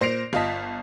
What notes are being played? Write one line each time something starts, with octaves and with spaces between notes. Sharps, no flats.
A#2 C5 A#6 C7 D7 F7
G1 F4 D#5 A5 B6